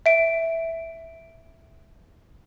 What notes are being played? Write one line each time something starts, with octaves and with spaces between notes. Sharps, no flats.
E5 D7